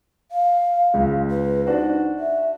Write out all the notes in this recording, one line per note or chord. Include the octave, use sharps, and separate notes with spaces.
F5
C#2 G#3
B4
D4 D#4 F#4 C5
E5